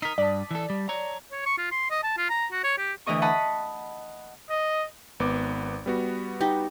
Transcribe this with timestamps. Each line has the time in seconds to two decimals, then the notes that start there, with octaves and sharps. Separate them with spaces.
0.02 D#4 A#4 D#6 B6
0.18 G2 D5 A5
0.51 E3 A4
0.70 G3
0.89 C#5 A#5
1.32 C#5
1.46 C#6
1.58 F4
1.71 C6
1.91 D#5
2.03 A5
2.17 F4
2.30 A#5
2.52 F#4
2.64 C#5
2.78 G4
3.06 D2 E3 E4 D#5 C#6
3.22 D#5 F#5 A5 B5
4.50 D#5
5.20 G#1 B3 D6
5.86 G3 B3 F#4
6.41 D#4 G4